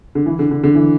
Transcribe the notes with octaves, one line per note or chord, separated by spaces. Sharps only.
D3
E3
D3
D3
D3
E3